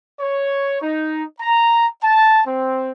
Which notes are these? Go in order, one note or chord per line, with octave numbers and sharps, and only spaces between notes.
C#5
D#4
A#5
A5
C4